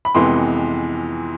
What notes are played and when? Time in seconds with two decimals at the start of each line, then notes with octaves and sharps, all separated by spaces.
0.05 B5
0.15 F2 C3 E3 G#3 B3 C6